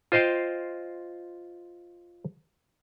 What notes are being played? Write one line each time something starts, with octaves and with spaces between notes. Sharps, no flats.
F4 C5 D#5 F5 G5